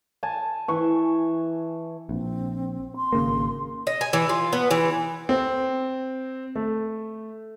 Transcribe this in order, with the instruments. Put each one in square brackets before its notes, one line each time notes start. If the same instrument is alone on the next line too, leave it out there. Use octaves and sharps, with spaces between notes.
[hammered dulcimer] G#5 A5
E3 C#6
[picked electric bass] A#1 [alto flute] C4
[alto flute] C6
[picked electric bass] G#1 C#3 A#3
[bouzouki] D#5
G#5
E3
F4
B3
E3
[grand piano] C4
A3